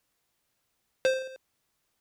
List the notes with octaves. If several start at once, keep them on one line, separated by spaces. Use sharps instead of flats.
C5